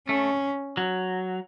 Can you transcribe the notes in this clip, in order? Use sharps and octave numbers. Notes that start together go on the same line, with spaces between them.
A3 C#4
F#3